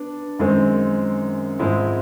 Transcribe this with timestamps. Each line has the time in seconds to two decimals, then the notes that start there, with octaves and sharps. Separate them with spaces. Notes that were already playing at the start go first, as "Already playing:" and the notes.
Already playing: B3 D4
0.39 F#2 D#3 G#3 C4
1.59 G#2 F3 G#3 C4 E4